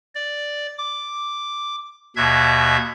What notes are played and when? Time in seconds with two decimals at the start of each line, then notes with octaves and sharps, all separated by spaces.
0.15 D5
0.78 D6
2.16 D#2 B2 E5 G#6